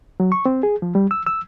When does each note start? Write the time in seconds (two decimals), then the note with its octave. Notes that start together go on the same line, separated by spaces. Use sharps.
0.20 F#3
0.32 C#6
0.46 C4
0.63 G#4
0.82 F3
0.95 G3
1.11 E6
1.26 E6